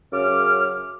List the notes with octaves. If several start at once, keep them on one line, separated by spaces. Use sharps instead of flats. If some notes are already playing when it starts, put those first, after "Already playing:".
F#2 C#3 D6 F6